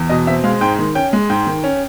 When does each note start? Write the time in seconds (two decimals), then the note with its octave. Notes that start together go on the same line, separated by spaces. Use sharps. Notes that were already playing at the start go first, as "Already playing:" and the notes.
Already playing: E2
0.09 B2 D#5
0.27 C4 E5
0.44 G#3 F5
0.61 G#2 G5
0.79 D#3
0.95 C#4 G5
1.13 G#3
1.30 G#2 G5
1.47 D#3
1.64 C#4